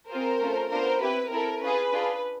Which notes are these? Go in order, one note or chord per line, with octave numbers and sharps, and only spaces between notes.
C4 F4 G#4 A#4 C5
A3 C#4 F4 A4
B3 D4 F4 A#4 C5
C4 E4 G4 B4
C4 E4 A4 A#4
C#4 F4 G#4 B4
D4 F4 G#4